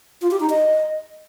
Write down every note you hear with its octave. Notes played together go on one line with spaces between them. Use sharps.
F4
G4
D#4
D#5